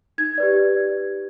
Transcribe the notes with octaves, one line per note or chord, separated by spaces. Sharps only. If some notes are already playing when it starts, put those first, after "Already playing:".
D#4 G#6
G4 B4 D5